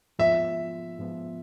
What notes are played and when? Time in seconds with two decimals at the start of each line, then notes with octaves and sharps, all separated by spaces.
0.19 G#2 F3 B3 F4 E5
0.99 G#2 F3 B3 F4